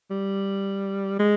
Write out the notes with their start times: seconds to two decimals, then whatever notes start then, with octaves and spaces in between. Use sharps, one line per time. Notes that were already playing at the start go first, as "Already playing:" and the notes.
0.11 G3
1.19 G#3